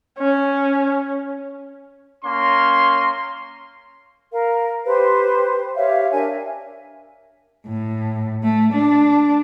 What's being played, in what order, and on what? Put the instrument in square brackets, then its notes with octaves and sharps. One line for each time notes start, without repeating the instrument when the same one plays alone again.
[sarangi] C#4
[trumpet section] A#3 C#4 C6
[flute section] A#4 F5
G4 B4 C5
G4 C#5 E5 F5
D4 A#4 E5 G#5
[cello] A2
A3
D4